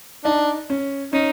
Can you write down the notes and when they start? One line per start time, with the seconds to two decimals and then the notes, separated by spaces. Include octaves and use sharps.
0.25 D4 D#4
0.70 C#4
1.13 C#4 D#4